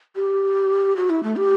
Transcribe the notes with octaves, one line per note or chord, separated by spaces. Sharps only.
G4
F#4
E4
A3
G4